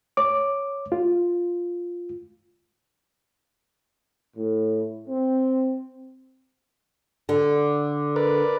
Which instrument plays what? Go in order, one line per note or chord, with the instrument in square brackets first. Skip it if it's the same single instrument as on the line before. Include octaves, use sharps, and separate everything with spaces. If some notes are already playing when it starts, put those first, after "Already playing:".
[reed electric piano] C#5 D6
F4
[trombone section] A2
C4
[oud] D3
[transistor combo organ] A#4 B4 D5